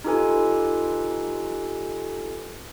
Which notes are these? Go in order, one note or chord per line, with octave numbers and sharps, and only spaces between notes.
D#4 F4 G4 A4 B4 G#5